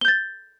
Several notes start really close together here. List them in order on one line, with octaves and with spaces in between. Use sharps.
G7 G6 A6